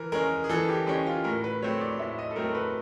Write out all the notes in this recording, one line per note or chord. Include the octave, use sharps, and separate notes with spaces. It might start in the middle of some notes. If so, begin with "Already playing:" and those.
Already playing: E3 A#4
G#3 C#4 A#4
G#4
E3 A4
G4
G#3 C#4 G4
F4
A2 A#4
B4
F#3 A3 C4 C#5
D5
A2 E5
D#5
A4
F#3 A3 C4 A#4
B4